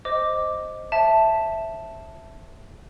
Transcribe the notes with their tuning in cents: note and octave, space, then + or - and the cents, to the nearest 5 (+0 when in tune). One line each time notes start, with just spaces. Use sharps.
C5 +0 D#5 +0 D6 +0
C#5 -45 E5 +0 A5 +0